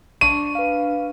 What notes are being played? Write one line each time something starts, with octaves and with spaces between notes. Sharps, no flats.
D4 C#6 D#7
B4 F5